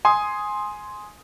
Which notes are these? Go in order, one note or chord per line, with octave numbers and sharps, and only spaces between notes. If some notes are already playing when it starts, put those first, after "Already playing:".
G#5 C6 D#6